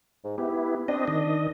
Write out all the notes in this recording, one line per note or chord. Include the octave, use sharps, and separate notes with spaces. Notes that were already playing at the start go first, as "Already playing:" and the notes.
G#2
B3 E4 G4
C4 D4 D#5
D#3 D#5